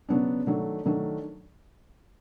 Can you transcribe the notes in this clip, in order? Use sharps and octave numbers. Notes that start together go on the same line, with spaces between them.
C#3 F#3 B3 D4
D#3 F#3 A3 D4
D#3 F#3 A3 D4